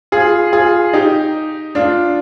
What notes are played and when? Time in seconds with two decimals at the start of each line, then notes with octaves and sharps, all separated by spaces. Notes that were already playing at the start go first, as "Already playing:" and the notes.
0.12 F4 G#4
0.53 F4 G#4
0.93 D#4 G4
1.75 D4 F4